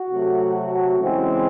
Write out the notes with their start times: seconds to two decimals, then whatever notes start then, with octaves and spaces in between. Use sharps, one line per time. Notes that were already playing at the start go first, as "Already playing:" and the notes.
Already playing: F#4
0.09 C3 F#3 A3
0.98 C#3 E3 G#3 C4